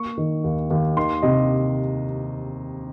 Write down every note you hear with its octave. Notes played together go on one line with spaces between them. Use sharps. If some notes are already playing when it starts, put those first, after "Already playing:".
Already playing: A#3 C#6
D#3
D#2
D#2
D#3 C6
C3 D#5